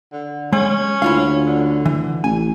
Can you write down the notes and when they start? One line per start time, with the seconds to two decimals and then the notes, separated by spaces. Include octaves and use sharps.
0.12 D3
0.53 G#3 C#4
1.02 D2 E4 F4 F5
1.46 D3
1.86 E3
2.24 A1 G#5